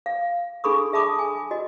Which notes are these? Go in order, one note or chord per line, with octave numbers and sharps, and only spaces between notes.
F5
D4 G#4 A4 B5 C#6 D#6
G#4 E5 A5 B5 D6 D#6
G#5
F#4 D#5